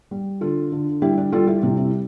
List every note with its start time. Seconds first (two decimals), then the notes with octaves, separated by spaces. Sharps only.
0.11 G3
0.41 D3 F4 A4
0.72 D3
1.02 G3 E4 G4
1.17 D4
1.32 G3 F4 A4
1.47 E4 G4
1.63 C3 C4 E4
1.77 C4 E4